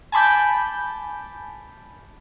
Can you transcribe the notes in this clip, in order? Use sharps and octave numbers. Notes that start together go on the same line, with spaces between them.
G#5 A5 B5 D6 G6